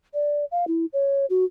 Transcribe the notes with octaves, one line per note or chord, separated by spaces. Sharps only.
D5
F5
E4
C#5
F#4